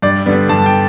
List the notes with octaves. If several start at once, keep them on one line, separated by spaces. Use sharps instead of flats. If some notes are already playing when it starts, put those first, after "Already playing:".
G2 D5
D3 G3 B3
G2 A5
G5